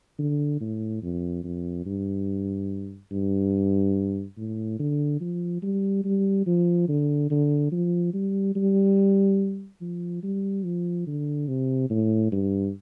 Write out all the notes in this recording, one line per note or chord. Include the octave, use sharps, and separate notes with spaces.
D3
A2
F2
F2
G2
G2
A2
D3
F3
G3
G3
F3
D3
D3
F3
G3
G3
F3
G3
F3
D3
C3
A2
G2